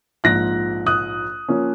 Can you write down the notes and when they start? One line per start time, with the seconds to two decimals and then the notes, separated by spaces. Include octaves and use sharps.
0.24 A#1 G#2 F3 F#6 A#6
0.86 D#6 F#6
1.49 F3 A#3 C#4